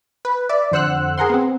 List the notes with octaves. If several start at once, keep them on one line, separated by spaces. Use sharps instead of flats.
B4
D5 E5
F2 D3 C5 F#5 E6 F#6
G#4 A#4 F#5 C6
B3 C4